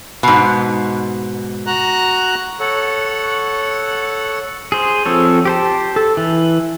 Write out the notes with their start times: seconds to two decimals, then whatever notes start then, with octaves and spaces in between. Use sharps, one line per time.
0.23 G#2 B2
1.67 F#4 A#5 F#6
2.59 A4 C#5 F#5
4.72 G#4 C5
5.06 F3 C4 A4 C#5
5.45 G4 C5 A5
5.96 A4
6.17 E3